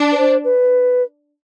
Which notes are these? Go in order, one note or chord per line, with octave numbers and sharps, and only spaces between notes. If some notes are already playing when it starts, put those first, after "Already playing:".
Already playing: D4
B4
C5
B4